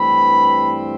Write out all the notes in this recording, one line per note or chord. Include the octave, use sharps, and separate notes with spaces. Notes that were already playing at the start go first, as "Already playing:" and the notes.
Already playing: G2 E3 A3 C4 B5